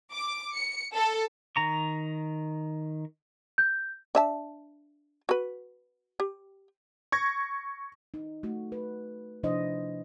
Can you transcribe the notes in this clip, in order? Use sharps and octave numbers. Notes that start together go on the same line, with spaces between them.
D6
C#7
A4
D#3 A#5 C#6
G6
D4 E5 A5
F#4 B4
G4
C#6 G#6 A#6
D#4
A3 F#4
B4
C3 F3 D4 E4 C5 D#5